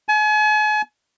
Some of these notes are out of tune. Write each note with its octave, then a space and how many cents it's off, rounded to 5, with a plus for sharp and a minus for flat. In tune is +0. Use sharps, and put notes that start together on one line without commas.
G#5 +40